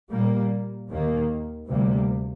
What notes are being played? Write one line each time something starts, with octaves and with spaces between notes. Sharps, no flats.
A#2 G3 A#3
D#2 D#3 A#3
D2 C3 G3 A#3